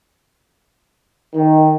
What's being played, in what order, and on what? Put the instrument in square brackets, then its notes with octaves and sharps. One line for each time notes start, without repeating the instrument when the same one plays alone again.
[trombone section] D#3